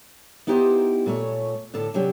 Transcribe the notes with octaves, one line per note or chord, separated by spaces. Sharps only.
B3 D#4 E4 G4 B4 C5
A#2 A3 C#5
A2 D3 A4 A5
C3 F#3 C#4 D4 G4